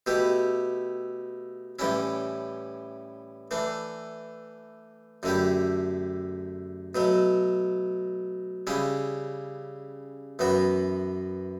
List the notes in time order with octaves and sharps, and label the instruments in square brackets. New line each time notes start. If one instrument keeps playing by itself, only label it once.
[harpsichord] B2 A3 E4 G4
A2 E3 G3 C#4 E4
E3 A3 D4
F#2 D3 A3 E4 G4
B2 F#3 A3
C#3 G3 C#4 E4
F#2 E3 B3 F#4